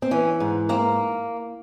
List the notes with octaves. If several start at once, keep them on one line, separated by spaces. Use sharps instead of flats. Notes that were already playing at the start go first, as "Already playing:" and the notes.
C4
E3 C#4
G#2
A#3 C4